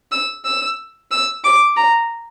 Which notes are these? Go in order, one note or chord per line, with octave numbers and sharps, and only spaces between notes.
E6
E6
E6
D6
A#5